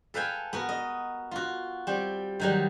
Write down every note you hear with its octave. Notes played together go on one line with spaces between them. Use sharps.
A4 B4 F5 G5 G#5
B3 F#4 A#4
D#5
F4 F#4
G3 C4
D#3 F#3 G3